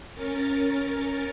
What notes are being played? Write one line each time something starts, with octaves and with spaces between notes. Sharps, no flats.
C#4 A#4 A6